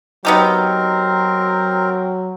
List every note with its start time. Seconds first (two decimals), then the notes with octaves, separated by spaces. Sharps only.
0.25 F#3 B3 C4 D#4 G4 A#4